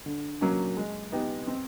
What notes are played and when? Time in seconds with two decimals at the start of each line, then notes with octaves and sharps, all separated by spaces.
0.06 D3
0.41 F#3 A#3 C#4
0.77 G#3
1.12 B3 D#4 G4
1.47 C4